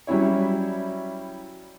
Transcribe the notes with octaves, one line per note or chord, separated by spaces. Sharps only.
F#3 G3 C#4 E4 C#5